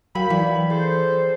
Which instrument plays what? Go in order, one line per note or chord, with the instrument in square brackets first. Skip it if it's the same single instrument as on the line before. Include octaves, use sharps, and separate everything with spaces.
[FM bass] F#3 [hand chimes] A#4 F5 G5 [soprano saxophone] B5
[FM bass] E3 [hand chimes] D5 G5
[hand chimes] G#4 [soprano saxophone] A4 [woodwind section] C5